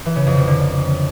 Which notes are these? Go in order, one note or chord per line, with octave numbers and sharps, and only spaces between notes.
E3
C#3
F2
C3
D3